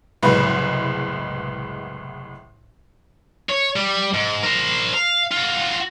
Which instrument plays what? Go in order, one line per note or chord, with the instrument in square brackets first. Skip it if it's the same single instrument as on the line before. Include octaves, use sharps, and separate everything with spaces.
[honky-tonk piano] F#1 C2 A2 G#3 B3 B4
[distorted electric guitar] C#5
G3
G#2
A#4 C5
F5
F4 F#4